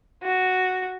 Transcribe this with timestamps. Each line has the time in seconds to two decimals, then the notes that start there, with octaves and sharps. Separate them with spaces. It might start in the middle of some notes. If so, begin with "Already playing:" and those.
0.23 F#4